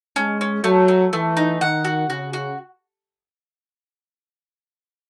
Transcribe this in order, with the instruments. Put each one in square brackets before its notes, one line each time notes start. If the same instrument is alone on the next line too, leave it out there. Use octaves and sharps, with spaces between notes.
[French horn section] G#3 [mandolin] C#4
[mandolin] C#4
[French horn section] F#3 [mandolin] A3
[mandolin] A3
[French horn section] E3 [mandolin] A3
[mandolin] D#4
[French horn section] D#3 [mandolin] F#5
[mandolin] F#4
[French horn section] C#3 [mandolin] F#4
[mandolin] F#4